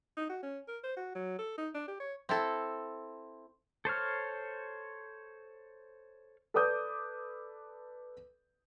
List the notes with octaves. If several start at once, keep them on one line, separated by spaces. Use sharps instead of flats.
D#4
F#4
C#4
A#4
C5
F#4
F#3
A4
D#4
D4
G4
C#5
C4 E4 A4
A4 C5 C#5 F6
A4 B4 D5 D6 D#6 G6